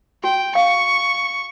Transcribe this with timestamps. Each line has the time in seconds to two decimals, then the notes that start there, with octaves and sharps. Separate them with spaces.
0.24 F#4 G5
0.55 F5 C#6